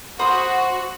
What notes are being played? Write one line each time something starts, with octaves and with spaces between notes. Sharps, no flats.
F#4 C5 B5 D#6